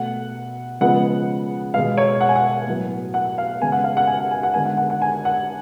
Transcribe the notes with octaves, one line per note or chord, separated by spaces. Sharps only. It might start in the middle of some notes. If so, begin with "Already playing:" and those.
Already playing: B2 A3 F#5
C#3 F3 G#3 B3 F#5
B2 G#3 B3 F5
C#5
F#5
G#5
F#5
A2 F#3 B3
F#5
F5
C#3 G#3 B3 G#5
F#5
F5
F#5
G#5
F#5
G#5
F#5
D3 G#3 B3 G#5
F#5
F#5
F#5
G#5
F#5